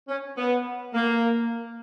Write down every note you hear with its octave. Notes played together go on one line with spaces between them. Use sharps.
C#4
B3
A#3